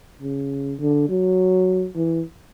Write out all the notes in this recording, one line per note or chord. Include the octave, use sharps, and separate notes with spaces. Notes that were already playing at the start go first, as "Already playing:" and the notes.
C#3
D3
F#3
E3